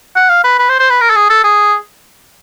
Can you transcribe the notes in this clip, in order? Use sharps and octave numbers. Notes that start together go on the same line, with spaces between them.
F#5
F5
B4
B4
C5
C5
B4
A#4
A4
G#4
A4
G#4